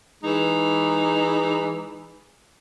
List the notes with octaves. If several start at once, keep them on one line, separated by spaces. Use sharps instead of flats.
E3 G#3 D#4